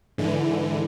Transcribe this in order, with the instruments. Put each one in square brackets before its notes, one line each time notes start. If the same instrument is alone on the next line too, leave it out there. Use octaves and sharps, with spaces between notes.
[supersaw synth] G#2 D3 E3